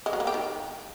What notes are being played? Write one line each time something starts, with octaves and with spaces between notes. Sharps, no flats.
G#3
F#3
A#3
G4
D#3